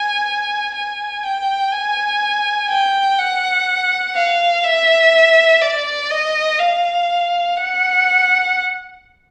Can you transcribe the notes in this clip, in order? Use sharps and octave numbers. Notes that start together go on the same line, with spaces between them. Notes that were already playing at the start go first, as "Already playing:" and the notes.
Already playing: G#5
G#5
G5
G#5
G5
F#5
F5
E5
D5
D#5
F5
F#5